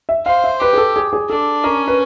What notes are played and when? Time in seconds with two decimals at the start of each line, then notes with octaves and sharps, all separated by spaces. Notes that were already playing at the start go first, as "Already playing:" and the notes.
0.09 E5
0.26 C5 F5
0.44 E5
0.60 G4 B4
0.73 G#4
0.78 A4
0.96 G#4
1.13 G#4
1.30 D4 A4
1.64 C#4 A#4
1.88 B4